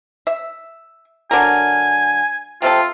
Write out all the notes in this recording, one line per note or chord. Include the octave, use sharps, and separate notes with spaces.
E5
D3 F#3 A#4 G#5
C3 C4 F4 A4